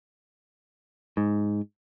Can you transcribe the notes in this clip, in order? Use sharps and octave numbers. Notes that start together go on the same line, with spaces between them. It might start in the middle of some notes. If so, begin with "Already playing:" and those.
G#2